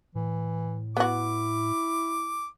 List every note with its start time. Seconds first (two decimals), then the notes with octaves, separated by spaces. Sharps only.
0.15 A2 E3
0.97 B3 E4 F#4 D6